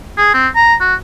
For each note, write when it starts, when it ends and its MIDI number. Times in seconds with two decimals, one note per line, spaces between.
0.18 0.33 68
0.34 0.47 60
0.56 0.74 82
0.80 0.94 66